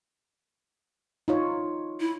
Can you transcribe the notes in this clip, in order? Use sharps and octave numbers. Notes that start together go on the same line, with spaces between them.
D#4 F4 C#5
E4